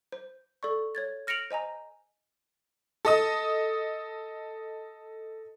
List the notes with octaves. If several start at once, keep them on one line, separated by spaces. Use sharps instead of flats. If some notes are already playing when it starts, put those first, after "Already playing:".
C5
A4 D5 C#6
C#5 G#6 A6
F6 A#6 C#7 D7 F7 F#7
C5 D#5 G#5 A#5
A4 D#5 D#6